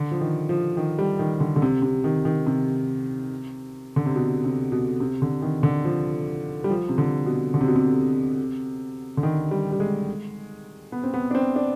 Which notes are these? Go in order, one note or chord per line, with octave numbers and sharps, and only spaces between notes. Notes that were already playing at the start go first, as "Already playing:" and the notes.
Already playing: D3
F3
D#3
F3
D#3
G3
D#3
D3
D3
C3
C3
D#3
D#3
C3
D3
C3
B2
C3
B2
C3
D3
D#3
D3
F3
G3
F3
C3
D3
B2
D3
C3
B2
C3
D3
D#3
G3
G3
G#3
B3
C4
B3
D4
C4
D4